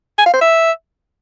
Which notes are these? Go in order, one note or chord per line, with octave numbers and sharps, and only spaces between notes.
G#5
F5
C5
E5